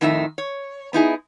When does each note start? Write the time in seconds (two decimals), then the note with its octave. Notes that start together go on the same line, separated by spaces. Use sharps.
0.01 F2 A2 D#3 D#4 E4 E5
0.38 C#5
0.93 B3 D#4 E4 G#4